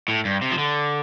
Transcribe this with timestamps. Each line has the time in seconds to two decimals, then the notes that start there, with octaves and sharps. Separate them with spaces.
0.08 A2
0.25 G2
0.41 C3
0.52 F3
0.58 D3